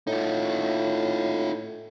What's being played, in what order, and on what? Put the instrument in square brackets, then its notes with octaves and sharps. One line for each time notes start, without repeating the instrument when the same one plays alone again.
[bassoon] A2 [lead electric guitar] D#4 F4